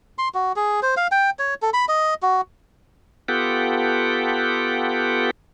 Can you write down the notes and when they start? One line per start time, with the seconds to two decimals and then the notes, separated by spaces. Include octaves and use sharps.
0.18 C6
0.34 F#4
0.56 G#4
0.83 C5
0.97 F5
1.12 G5
1.39 C#5
1.62 A4
1.74 B5
1.89 D#5
2.23 F#4
3.28 B3 F4 G4 A4 F#5 G5